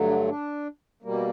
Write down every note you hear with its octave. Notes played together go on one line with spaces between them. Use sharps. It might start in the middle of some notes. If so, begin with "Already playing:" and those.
Already playing: G2 D3 F#3 A3
D4
D4
B2 G3 A#3